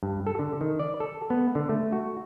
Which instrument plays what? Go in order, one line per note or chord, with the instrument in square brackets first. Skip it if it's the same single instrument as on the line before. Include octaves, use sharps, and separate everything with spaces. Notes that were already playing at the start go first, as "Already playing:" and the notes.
[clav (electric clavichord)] G2
A4
D3
D#3
D5
A4
B3
D3
A3
F#4